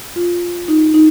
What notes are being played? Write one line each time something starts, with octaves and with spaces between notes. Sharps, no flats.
F4
D#4
D#4